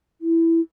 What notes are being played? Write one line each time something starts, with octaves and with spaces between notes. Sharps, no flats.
E4